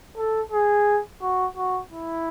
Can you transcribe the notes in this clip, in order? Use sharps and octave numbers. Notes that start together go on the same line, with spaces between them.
A4
G#4
F#4
F#4
E4